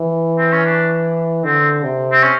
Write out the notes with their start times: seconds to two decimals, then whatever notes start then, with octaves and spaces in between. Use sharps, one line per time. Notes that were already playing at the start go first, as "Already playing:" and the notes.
Already playing: E3
0.38 C4
0.52 C#4
0.66 D4
1.44 D3 C4
1.84 C3
2.12 C4
2.23 C#4